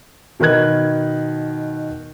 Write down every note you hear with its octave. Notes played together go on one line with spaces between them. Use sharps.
B2 D#3 A#4 B4 F#6 G#6